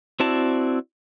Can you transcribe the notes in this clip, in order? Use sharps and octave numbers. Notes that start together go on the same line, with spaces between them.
C4 E4 F#4 D5 A5